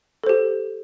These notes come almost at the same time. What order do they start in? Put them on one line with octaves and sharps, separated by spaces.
A4 C5 G4